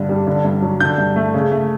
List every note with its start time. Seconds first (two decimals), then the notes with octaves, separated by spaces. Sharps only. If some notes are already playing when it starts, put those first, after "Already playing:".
Already playing: G2 D3
0.09 G3
0.27 D3
0.45 G2
0.62 F#3
0.80 D3 G6
0.98 G2
1.16 A3
1.34 C#3
1.52 A3